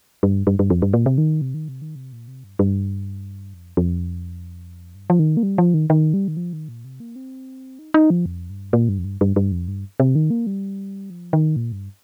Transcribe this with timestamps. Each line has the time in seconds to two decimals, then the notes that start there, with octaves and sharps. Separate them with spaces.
0.23 G2
0.47 G2
0.59 G2
0.70 F2
0.82 G2
0.94 A#2
1.06 C3
1.18 D#3
1.41 C3
1.54 D#3
1.68 C3
1.82 D#3
1.95 C3
2.12 A#2
2.28 C3
2.44 G2
2.59 G2
3.54 F2
3.77 F2
4.95 G2
5.10 F3
5.19 D#3
5.37 A#3
5.43 G3
5.58 F3
5.74 D#3
5.90 D#3
6.14 G3
6.28 D#3
6.37 F3
6.53 D#3
6.68 A#2
6.85 C3
7.00 A#3
7.16 C4
7.79 D#4
7.94 D#4
8.10 F3
8.26 F2
8.50 G2
8.73 A#2
8.89 G2
8.98 F2
9.04 G2
9.21 G2
9.36 G2
9.52 F2
9.68 G2
10.00 C3
10.15 D#3
10.30 A#3
10.47 G3
11.10 F3
11.33 D#3
11.56 A#2
11.72 G2